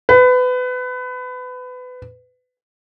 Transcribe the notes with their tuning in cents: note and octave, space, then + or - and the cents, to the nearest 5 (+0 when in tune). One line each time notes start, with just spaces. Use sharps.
B4 +25